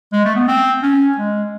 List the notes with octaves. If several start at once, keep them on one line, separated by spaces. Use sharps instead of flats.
G#3
A3
B3
C4
C#4
G#3